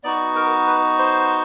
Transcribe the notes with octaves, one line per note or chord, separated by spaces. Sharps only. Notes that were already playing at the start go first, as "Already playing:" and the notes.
B3 D#4 F#4 D5
A#4
B4
C5